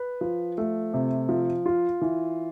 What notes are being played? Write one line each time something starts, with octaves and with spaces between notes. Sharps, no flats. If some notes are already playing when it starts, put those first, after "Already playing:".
Already playing: B4
F3
A3
C3
F3
F4
E3